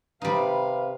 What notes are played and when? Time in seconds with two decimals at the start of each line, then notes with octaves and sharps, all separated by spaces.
0.22 C3 G3 D#4 B4 F5